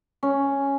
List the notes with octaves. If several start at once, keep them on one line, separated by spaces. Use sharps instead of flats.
C#4